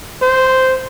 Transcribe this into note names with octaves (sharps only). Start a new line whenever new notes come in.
C5